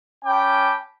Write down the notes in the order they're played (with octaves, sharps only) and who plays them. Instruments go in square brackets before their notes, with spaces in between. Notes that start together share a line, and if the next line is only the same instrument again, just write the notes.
[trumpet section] C#4 G5 A5 B5 D6